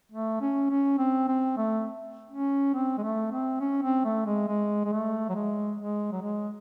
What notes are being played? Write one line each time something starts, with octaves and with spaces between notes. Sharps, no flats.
A3
C#4
C#4
C4
C4
A3
C#4
C4
G#3
A3
C4
C#4
C4
A3
G#3
G#3
G#3
A3
F#3
G#3
G#3
F#3
G#3